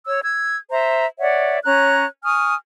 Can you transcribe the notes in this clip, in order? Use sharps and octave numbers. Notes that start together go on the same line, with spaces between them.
C#5 E6
E6 G#6
C5 E5 A#5
C#5 D5 E5 F#5
C#4 C#5 A#5 F#6
G#5 C#6 D#6 F6